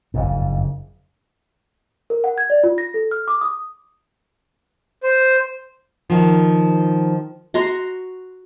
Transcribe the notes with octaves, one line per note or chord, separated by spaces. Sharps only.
F#1 F2 G#2
A#4
F#5
G#6
D5
F4
A#6
A4
F6
D6
D#6
C5
D#3 F3
F#4 A#5 C6